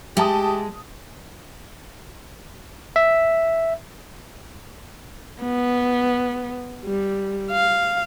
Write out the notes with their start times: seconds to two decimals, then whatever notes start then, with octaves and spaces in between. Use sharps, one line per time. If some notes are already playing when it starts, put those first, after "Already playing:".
0.17 G#3 G4 E5 A5 D#6
2.96 E5
5.42 B3
6.85 G3
7.51 F5